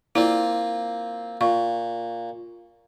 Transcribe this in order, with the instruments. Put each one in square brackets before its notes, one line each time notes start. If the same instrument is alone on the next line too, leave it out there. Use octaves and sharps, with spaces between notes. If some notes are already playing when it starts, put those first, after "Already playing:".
[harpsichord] A#3 C4 F4 [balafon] E4 D5
[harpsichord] A#2 [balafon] F5 C#6